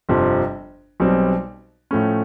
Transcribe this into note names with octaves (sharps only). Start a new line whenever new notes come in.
G1 F2 C3 F3
B1 B2 G3 C4
A2 F3 A3 C#4